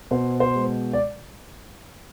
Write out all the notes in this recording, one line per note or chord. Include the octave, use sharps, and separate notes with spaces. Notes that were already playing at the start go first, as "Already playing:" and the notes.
B2 C5
C5
G#3
D5